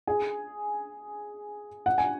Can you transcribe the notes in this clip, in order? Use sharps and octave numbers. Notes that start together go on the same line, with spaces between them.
G#4 G#5
F#5
G#5